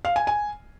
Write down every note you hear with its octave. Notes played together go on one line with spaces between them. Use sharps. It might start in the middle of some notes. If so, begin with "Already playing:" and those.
F5
G#5
G#5